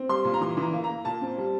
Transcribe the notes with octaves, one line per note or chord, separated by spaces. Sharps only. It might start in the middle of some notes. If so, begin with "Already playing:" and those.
Already playing: C4
G3 C6
A#2
A#5
E3 C6
E3 A#5
A#3
A#5
A#3
A#2 A5
C4
G3